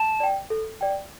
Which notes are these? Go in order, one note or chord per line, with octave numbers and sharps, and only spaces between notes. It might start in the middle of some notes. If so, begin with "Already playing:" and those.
Already playing: A5
D5 G5
A4
D5 G5